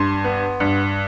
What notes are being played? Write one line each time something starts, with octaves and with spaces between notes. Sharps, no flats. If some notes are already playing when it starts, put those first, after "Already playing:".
Already playing: G2 C6
B3
G2